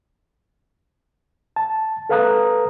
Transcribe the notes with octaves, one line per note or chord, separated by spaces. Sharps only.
A5
A4 B4 F5 A#5 D#6 F#6